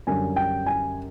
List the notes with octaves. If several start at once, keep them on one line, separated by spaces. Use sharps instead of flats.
F#2 D3 G3 G#5
G5
G#5